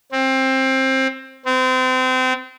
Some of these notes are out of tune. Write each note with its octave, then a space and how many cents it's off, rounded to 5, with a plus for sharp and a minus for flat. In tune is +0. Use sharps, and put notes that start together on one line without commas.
C4 +20
C4 -30